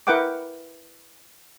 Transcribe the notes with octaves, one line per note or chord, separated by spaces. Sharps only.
E4 A#4 B4 F#5 G5 D6